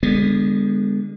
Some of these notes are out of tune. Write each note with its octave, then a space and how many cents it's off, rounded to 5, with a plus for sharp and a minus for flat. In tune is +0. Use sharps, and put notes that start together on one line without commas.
D3 +0 G#3 -35 B3 +0